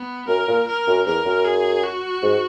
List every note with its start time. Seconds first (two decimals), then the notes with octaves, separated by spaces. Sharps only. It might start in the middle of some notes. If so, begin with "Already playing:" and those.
Already playing: B3
0.28 F#2 A#4
0.48 A#2
0.68 A#4
0.87 F#2
1.06 E2 A#4
1.25 F#2
1.45 G#4
1.83 F#4
2.22 G#2